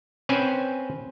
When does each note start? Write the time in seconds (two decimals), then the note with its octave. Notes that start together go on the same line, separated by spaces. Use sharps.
0.29 C4 C#4 B4 C5 G5 G#5